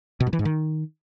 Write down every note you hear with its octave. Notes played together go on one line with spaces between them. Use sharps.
B2
G2
E3
G#2
D#3